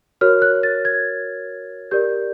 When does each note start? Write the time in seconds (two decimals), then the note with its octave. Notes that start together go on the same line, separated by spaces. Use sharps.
0.21 F#4 A#4 C#5 F6
0.42 F#6
0.63 A6
0.85 G#6
1.91 G4 A#4 D5 G6